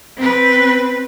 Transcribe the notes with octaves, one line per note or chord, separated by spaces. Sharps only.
C4 B4